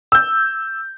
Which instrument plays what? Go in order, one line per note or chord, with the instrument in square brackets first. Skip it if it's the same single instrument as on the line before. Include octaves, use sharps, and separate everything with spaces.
[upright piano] E6 G6